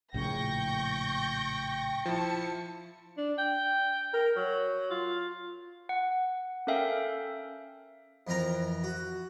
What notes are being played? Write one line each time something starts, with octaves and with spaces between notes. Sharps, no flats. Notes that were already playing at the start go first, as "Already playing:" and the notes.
A#1 A2 C#3 G5 C#6 G6 A#6
F3 E4 A5 C#7
D4
G5
A#4
F#3
F4
F#5
C#4 A4 A#4 E5 F5 G5
F2 E3 C4 A#4 A#5
F#4